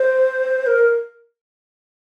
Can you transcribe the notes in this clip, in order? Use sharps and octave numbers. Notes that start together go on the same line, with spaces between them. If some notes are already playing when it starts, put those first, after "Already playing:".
Already playing: C5
A#4